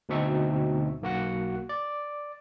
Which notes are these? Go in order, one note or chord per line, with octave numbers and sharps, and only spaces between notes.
D2 B2 C4 D#4 E5 C#6
B1 A#3 F#4 F#5
D5